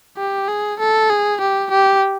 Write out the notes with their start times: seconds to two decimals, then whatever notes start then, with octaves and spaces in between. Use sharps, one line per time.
0.17 G4
0.48 G#4
0.80 A4
1.09 G#4
1.41 G4
1.71 G4